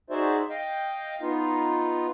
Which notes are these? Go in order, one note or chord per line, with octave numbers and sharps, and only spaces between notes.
D#4 F#4 G#4 C5 D5 E5
D#5 F5 G5
B3 D#4 F4